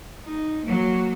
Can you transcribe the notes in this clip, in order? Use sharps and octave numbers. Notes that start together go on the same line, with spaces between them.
D#4
F#3 A#3